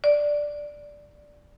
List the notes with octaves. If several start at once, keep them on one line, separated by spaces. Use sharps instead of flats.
D5